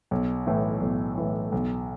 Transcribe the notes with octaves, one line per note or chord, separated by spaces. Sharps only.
B1
A2 E3
B1
A2 E3
B1